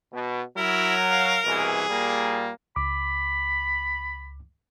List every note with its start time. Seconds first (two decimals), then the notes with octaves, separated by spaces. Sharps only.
0.12 B2
0.57 F#3 E4 A#4
1.11 F5
1.45 C2 B2 E3 G#4
1.88 A#2 G3 A#3
2.76 C#2 B5 D6